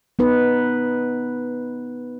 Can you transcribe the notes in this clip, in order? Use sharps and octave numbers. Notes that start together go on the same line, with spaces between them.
B3 D#4 B4